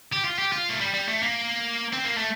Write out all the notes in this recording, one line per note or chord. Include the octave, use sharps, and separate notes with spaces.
G4
F4
G4
F4
A3
G3
G3
A3
A#3
C4
A#3
A3